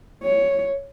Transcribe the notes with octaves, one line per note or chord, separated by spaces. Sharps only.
C#5